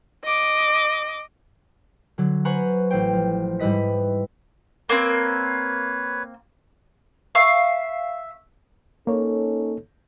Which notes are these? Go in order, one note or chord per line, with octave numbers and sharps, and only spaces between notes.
D#5 D6
D3 F#3
B4 C5 F#5 G#5 A#5 C#6
A1 C5 G5
F3
G#2 G3 E4 B4 D#5 B6
A#3 C4 B4 C#5
E5 F5 C#6
A#3 C#4 D#4 A4 C#5